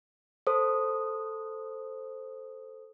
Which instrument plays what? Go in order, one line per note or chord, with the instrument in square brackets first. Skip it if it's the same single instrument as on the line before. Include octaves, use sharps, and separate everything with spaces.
[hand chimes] A4 C5 D#6